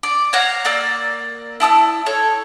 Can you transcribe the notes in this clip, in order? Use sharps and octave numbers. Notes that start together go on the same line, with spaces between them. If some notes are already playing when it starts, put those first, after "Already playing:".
D5
C#5 F5 F#5 A#5
A#3 D5 E6
E4 A5 D#6 E6
A4 C#5